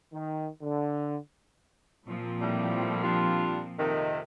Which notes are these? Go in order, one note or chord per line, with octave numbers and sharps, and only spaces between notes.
D#3
D3
A#2 F3 C4
A2 G3
G3 D4 F4
F2 C3 D#3